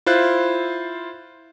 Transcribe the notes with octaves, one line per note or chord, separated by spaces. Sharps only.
E4 F4 C5 F#6